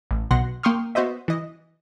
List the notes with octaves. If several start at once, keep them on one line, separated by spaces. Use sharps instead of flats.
A1
B1 B2 F#5 C6 A#6
A#3 G5 C6 C#6 D#6 F6
B3 F#4 C5 D#5 E5
E3 D#5